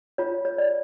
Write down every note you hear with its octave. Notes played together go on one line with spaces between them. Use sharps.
F4 C#5
C#5
D5